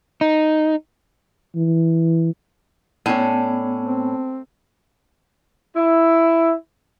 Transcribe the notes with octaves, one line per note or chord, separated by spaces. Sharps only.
D#4
E3
A2 B3 C#4 D4
C4
E4